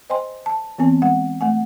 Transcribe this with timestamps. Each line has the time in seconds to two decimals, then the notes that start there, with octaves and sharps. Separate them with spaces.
0.10 C5 D#5 G5 G#5 C6
0.46 A5
0.78 E3 B3 C4 G#5
1.02 G#3 F#5
1.41 A3 F#5 G#5